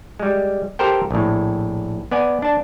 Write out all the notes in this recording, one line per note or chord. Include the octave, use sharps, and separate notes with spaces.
G3 G#3
G4 A4 A#4 C5 G5
A#1 A2
B3 D5 G#5
D4 A5